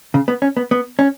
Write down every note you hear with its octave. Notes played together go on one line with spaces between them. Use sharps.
C#3
B3
C#4
B3
B3
C#4